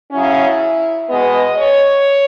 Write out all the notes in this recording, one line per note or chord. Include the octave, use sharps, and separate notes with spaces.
C#3 F#3 C#4 E4
B2 G#3 B3 D#5
C#5